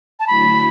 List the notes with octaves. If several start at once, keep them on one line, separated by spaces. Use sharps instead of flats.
A5
D3 F#3 A3 E4 B5